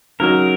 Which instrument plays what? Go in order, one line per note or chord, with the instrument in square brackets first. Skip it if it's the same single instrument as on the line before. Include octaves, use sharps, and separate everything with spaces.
[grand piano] C#3 F#3 D#4 F#4 [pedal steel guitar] A#4